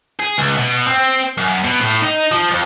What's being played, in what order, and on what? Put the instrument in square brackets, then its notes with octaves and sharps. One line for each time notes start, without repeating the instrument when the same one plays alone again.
[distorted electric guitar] G#4
C#2
B2
C4
F#2
B2
A2
D#4
F3
F2